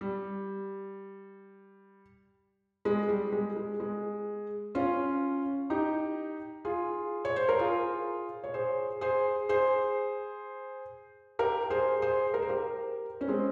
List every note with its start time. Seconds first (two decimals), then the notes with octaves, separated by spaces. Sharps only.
0.01 G3
2.85 G#3
3.09 G3
3.32 G#3
3.57 G#3
3.80 G#3
4.75 C#4 F4
5.70 D#4 G4
6.65 F4 G#4
7.25 C#5
7.36 C5
7.49 A#4
7.59 F4 G#4
8.44 C#5
8.54 G#4 C5
9.01 G#4 C5
9.49 G#4 C5
11.39 G4 A#4
11.70 G#4 C5
12.02 G#4 C5
12.34 A#4
12.42 C5
12.49 G4 A#4
13.21 C#4
13.28 G#3 C4